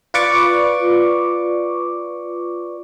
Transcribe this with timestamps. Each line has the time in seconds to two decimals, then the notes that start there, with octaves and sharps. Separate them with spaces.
0.14 F4 B4 D5 C#6 D6